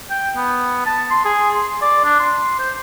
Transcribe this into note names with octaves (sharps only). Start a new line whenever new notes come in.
G5
B3
A5
C6
G#4
C6
D5
D4
C6
C5